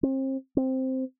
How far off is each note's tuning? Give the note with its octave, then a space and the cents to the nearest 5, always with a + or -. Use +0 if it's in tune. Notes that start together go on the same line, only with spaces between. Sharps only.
C4 +35
C4 +0